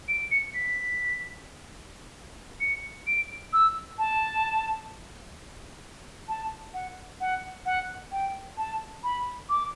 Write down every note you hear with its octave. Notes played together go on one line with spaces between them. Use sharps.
D7
C#7
B6
C#7
D7
E6
A5
A5
F#5
F#5
F#5
G5
A5
B5
D6